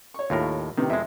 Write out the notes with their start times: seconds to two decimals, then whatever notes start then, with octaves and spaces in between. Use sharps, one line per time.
0.14 C#5 C#6
0.30 D#2 A2 F4 A#4
0.78 A2 C3 D#3 B3
0.90 F2 G#3 E5